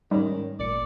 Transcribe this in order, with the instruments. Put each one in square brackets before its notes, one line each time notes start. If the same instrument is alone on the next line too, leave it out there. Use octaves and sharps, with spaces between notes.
[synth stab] G#2 C#4 D#4 [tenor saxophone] D#3 [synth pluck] G3
[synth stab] A1 A#2 C#7 [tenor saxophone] D5